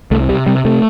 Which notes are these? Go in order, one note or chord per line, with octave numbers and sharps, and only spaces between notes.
C2 A3
C3 G3
C3 G3
C3 A3